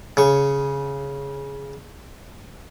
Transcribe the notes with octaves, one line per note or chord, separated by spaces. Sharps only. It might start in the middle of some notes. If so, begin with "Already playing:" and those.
C#3 C#6